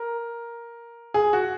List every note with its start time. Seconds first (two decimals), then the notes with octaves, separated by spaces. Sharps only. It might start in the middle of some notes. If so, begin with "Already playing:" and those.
Already playing: A#4
1.14 G#4
1.33 F#4